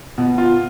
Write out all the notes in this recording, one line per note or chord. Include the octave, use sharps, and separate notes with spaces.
B2
F4